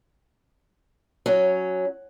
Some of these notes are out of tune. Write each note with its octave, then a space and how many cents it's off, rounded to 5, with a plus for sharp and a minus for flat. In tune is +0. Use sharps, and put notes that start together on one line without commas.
F#3 +0 C#4 +0